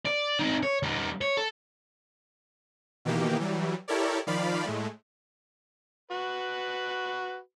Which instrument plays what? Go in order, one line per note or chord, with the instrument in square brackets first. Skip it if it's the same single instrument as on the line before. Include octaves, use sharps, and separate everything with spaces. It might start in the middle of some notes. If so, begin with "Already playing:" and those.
[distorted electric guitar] D5
C4 D#4
C#5
G3 D#4
C#5
A4
[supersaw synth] B2 D#3 E3 A#3 G4
E3 F#3 G3
E4 G4 A4 A#4 C#5 D5
D#3 F3 D5 F5 B5
A2 G#3 A3
[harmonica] F#4 B4